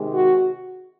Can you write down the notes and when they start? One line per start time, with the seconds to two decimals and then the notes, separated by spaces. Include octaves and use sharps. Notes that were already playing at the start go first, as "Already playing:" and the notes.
Already playing: C3 D#3 G#3
0.14 F#4